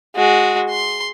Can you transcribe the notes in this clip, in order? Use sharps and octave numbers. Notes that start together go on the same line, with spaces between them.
G#3 F#4
C6